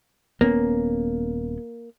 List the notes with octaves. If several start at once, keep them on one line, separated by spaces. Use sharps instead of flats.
D#1 A#3 B3 C#4